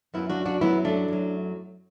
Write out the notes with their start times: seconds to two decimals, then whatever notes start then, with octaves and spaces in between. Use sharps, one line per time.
0.14 F#2 F#3 B3 E4
0.30 D4 F#4
0.46 D4 F#4
0.61 F#2 F#3 B3 E4
0.85 A3 D4
1.08 F#2 F#3